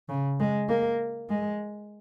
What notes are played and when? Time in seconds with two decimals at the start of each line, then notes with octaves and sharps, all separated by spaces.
0.09 C#3
0.40 G#3
0.69 A#3
1.29 G#3